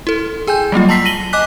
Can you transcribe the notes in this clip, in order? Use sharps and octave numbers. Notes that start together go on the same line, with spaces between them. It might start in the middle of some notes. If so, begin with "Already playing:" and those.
E4 A4
G#4 G5 G#5 G6
F#3 G3 A#3 F4
A5 A#5 C6 E6 B6 C7
A#6 D#7 F#7 G7
D#5 G#5 D6 F#6 B6